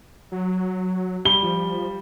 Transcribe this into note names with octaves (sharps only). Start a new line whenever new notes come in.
F#3
G3 G7
F3